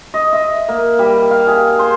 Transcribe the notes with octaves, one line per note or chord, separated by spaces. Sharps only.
D#5
E5
A#3
G3
F5
G#4
C5